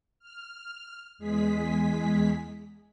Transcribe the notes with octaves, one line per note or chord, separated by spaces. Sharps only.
F6
E2 G#3 G#4 B6